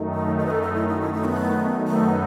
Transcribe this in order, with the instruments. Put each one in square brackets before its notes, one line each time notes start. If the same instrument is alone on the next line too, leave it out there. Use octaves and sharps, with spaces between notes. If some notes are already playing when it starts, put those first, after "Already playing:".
Already playing: [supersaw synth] F#2 D#3 A3 D#4
[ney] D#5
D#5
B4
A4
A4
E4
D#4
E4
D#4
B3
[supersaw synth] F#2 D#3 F#3 B3 D#4 [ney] A3